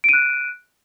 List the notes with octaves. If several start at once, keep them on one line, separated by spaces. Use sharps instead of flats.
F#6 D7 D#7